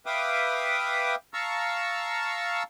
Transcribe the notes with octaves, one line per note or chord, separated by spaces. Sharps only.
B4 E5 F5 G5 D6 D#6
F5 A5 A#5 C#6 E6